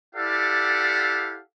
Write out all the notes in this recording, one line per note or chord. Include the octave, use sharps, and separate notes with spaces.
E4 G4 A4 D5 F5 F#5